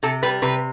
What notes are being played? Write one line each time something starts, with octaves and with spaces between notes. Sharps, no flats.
C3 A4
G3 B4
C3 B4